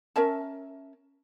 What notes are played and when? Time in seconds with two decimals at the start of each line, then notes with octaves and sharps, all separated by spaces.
0.16 C#4 A#4 E5 A5